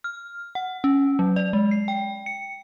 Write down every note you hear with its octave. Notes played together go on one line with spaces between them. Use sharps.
F6
F#5
C#4
F#3
D5
G#3
C7
G5
C#7